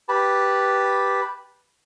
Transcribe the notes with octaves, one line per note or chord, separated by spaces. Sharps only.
G4 B4 A5 B5